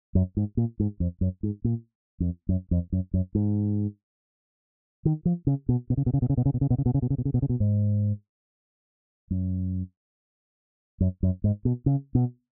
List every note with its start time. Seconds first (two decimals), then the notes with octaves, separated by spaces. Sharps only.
0.15 F#2
0.37 G#2
0.57 A#2
0.80 G#2
1.00 F2
1.21 F#2
1.43 G#2
1.64 A#2
2.20 F2
2.49 F#2
2.71 F2
2.92 F#2
3.14 F#2
3.35 G#2
5.05 D#3
5.25 F3
5.47 C#3
5.69 B2
5.90 B2
5.97 C#3
6.06 B2
6.14 C#3
6.22 B2
6.30 C#3
6.37 B2
6.46 C#3
6.54 B2
6.61 C#3
6.70 B2
6.78 C#3
6.86 B2
6.94 C#3
7.02 B2
7.10 C#3
7.18 B2
7.25 C#3
7.34 B2
7.42 C#3
7.49 B2
7.60 G#2
9.31 F#2
11.00 F#2
11.23 F#2
11.44 G#2
11.65 B2
11.86 C#3
12.15 B2